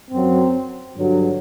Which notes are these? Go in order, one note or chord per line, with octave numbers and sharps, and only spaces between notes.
F#2 F#3 C4
G2 D3 F#3